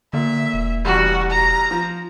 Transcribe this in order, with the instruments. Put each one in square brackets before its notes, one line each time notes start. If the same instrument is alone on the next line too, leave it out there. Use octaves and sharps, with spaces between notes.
[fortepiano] A#2 [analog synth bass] D3 [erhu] E5
[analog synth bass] E1
[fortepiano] A1 G3 [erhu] F#4
[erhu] A#5
[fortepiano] F3